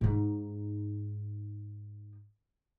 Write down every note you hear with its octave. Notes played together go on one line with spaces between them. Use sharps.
G#2 D#4